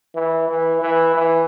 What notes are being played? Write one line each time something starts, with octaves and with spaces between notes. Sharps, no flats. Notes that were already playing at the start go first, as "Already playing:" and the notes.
E3
E3
E3
E3